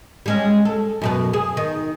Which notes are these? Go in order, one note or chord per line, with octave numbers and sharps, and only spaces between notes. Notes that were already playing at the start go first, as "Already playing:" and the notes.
G3 G#3 C#4
A4
F#2 B2 B4
G#4
D#3